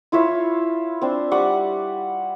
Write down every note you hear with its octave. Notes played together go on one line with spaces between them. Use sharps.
E4 F4 C#5 E5
C4 D4
G3 F#5 C#6 D6